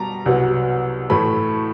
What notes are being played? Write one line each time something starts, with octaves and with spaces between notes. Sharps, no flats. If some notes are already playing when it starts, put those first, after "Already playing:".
Already playing: B2 G3 A5 A#5
C2 B2 F#3 B3
A2 E3 A3 B5